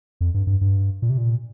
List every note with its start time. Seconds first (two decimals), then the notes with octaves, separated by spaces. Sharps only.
0.21 F2
0.34 G2
0.47 G2
0.61 G2
1.02 A#2
1.10 C3
1.18 A#2